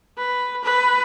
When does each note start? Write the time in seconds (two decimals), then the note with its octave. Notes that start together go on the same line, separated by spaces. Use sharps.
0.18 B4
0.64 B4